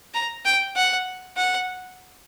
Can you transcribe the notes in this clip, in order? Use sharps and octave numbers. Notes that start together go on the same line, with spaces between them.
A#5
G5
F#5
F#5